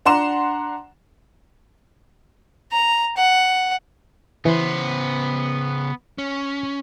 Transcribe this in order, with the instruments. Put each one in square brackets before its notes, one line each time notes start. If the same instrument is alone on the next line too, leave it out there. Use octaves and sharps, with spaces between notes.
[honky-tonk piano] D4 F#5 A#5 C6 E7
[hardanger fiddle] A#5
F#5
[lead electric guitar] C#3 C5 [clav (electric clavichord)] E3 [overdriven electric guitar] B3
[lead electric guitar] C#4